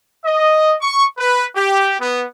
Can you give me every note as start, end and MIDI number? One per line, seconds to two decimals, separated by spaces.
0.25 0.74 75
0.80 1.03 85
1.18 1.45 71
1.55 1.95 67
2.00 2.23 59